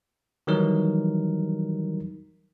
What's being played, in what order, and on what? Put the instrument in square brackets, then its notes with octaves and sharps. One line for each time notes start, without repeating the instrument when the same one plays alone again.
[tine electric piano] D#3 E3 F#3 G3 D#4 A#4